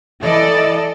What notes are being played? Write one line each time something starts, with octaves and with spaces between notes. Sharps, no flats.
E3 A4 D5 D#5